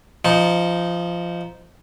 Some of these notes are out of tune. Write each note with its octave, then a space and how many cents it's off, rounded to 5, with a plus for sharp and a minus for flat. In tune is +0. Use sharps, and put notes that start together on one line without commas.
F3 -15 D#4 +0